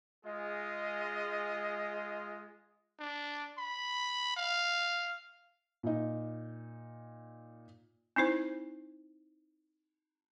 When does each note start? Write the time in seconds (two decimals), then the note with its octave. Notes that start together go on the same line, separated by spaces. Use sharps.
0.25 G#3 F4 G#4 D#5
2.99 D4
3.58 B5
4.37 F5
5.83 A#2 D#4
8.16 C4 D#4 E4 C5